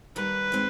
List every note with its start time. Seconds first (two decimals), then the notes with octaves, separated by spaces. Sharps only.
0.16 D#2 D#3 G3 B4
0.52 D#3 G#3 C4